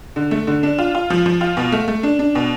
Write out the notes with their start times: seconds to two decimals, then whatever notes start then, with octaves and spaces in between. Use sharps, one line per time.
0.16 D3
0.31 A3
0.47 D3
0.63 D4
0.78 F4
0.95 F4
1.10 F3
1.26 F3
1.41 F4
1.57 B2
1.72 A3
1.88 A3
2.03 D4
2.19 D4
2.35 B2